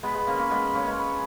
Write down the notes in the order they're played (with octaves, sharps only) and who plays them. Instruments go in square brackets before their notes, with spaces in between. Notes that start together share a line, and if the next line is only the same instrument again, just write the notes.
[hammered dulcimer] G#3 B3 [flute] B5
[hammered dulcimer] G#3 B3
A#3 C#4
A#3 C#4
G#3 B3
A#3 C#4
G#3 B3
[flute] B5